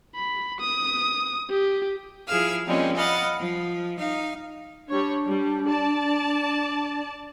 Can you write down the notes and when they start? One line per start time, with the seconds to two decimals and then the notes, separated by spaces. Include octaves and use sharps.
0.15 B5
0.60 D#6
1.50 G4
2.28 F3 E4 G#4 F5 E6 F6
2.67 F3 G3 G#3 A#3 C4 C#4
2.95 D#5 F5 F#5 B5 A6
3.39 F3
3.98 D#4 F5
4.88 G3 D4 C#5
5.25 G3
5.64 D5 A5